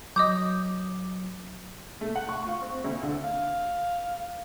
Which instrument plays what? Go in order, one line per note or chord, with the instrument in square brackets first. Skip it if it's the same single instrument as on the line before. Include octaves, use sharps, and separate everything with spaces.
[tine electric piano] F#3 [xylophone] D#5 D#6 G6 [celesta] D6
[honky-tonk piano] A3
F#5
C#6
F4
C4
D2
D3
[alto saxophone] F5